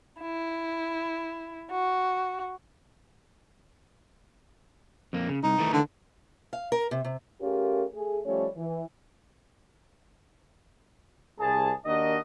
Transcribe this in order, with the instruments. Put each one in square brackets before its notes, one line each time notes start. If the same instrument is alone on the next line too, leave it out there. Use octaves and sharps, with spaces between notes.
[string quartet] E4
F#4
[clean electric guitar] F2 A#3
C#3
[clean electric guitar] C2 [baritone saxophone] D#4
[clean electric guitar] D#3 E3 A3
[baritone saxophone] D3
[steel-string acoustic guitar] F5
A#4
C3
C3
[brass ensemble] A3 C#4 F4 G4 G#4 A#4
A3 G#4
F3 G3 A3 C#4 G4 C#5
E3
C2 G#4 A5
D#2 D4 D#4 F#4 A#4 D#5